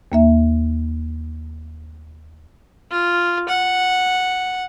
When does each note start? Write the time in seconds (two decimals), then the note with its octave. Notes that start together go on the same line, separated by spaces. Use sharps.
0.12 D#2 A#3 E5
2.91 F4
3.49 F#5